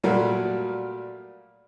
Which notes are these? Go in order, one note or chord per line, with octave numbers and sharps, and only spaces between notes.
A#2 F#3 G3 A3 F#4 A#4